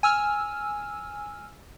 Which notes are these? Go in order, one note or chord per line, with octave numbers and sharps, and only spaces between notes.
G#5 E6 F6